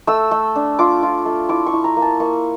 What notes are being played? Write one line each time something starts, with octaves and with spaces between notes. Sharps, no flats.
A3 E6
A3
D4
F4 D6
F4
A3
E4 D6
C#6
E4
A#5
A#3
A5
A#3 C#6